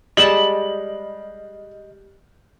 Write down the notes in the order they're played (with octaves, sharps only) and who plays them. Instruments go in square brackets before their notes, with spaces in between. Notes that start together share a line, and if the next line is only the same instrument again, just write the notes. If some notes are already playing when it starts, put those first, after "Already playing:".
[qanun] G3 G#3 A5 [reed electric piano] D#5 [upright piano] F#7